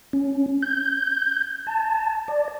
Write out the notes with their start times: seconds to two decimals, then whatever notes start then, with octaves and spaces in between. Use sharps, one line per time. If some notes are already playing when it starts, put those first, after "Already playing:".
0.13 C#4
0.62 G6
1.67 A5
2.28 D5